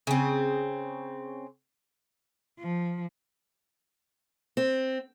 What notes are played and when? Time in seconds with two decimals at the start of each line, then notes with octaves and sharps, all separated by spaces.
0.07 C#3 C4
2.59 F3
4.57 C4